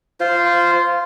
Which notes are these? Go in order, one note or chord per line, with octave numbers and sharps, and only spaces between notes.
F4 C5